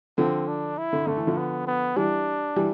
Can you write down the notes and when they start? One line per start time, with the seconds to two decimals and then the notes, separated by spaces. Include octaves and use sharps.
0.18 D3 F3 C4
0.48 D4
0.78 E4
0.93 D3
1.07 D3 A3
1.17 E3
1.27 D3 F3
1.37 B3
1.67 B3
1.96 E3 G3 D4
2.56 E3 G3